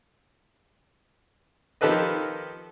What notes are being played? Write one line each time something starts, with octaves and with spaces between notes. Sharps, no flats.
D#3 F3 G4 A4 B4 D#5